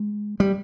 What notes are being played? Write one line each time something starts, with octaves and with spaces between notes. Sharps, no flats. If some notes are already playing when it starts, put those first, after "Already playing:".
Already playing: G#3
G3